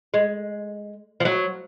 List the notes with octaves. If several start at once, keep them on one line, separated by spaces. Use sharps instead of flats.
G#3
F3
F#3